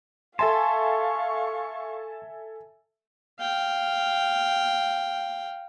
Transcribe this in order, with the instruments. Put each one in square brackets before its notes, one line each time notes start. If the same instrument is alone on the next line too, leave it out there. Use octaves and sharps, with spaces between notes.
[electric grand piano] A4 E5 G#5 [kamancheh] F5 C#6 [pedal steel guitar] A5 [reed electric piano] C6
[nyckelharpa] F5 G5